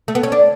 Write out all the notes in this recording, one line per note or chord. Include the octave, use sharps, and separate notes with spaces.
A3
B3
C#4
D4